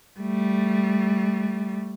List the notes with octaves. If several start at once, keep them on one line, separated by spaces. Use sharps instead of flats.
G3 A3